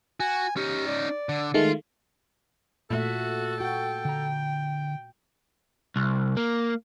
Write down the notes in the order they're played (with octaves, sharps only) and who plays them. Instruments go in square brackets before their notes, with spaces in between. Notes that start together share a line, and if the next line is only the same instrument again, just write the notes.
[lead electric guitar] F#4 [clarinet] G#5
[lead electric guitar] C#4 D#4 [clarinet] G4
[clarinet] D5
[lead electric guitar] D3
[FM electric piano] D#3 G#3 A3 [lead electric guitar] F4
[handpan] A#2 A3 E5 [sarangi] F#4 [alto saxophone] A4
[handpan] F#4 [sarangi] G5
[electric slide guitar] D3 A#5
[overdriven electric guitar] C2
A#3